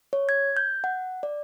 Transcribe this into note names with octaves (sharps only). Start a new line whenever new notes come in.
C#5
G#6
G6
F#5
D5